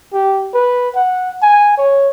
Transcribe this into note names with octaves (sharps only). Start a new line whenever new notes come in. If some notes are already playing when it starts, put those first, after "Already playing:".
G4
B4
F#5
G#5
C#5